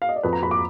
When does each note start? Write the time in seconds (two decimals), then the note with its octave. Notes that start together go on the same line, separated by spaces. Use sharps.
0.02 F5
0.09 D#5
0.16 D5
0.23 F2 B4
0.33 A#5
0.43 F2 B5
0.51 D6